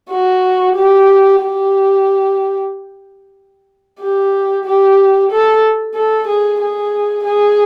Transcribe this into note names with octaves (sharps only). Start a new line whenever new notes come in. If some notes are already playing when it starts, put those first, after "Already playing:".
F#4
G4
G4
G4
G4
A4
A4
G#4
G#4
G#4